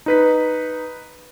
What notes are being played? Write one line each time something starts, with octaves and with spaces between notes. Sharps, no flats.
D#4 B4 B6